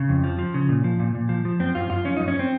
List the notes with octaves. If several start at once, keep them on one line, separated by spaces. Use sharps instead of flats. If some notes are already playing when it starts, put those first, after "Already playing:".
Already playing: C#3
F2
F3
F3
C#3
A#2
F3
A#2
A#2
F3
F3
F#2 C4
F#2 F4
F#2 F4
F3 C#4
F#2 D#4
C#4
C4